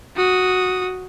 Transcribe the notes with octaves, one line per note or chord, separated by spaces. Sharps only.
F#4 D#6